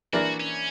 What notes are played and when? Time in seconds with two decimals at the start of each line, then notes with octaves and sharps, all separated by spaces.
0.13 E3 A#3 D4 F#4 A#4 D5
0.40 C#4